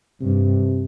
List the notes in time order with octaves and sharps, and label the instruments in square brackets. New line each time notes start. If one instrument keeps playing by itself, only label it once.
[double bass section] G2 [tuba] C3